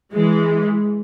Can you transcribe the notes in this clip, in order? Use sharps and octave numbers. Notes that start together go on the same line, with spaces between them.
E3 G#3